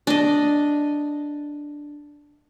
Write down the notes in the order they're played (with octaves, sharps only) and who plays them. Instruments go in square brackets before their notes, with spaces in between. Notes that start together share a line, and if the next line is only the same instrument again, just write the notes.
[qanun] D4 D#5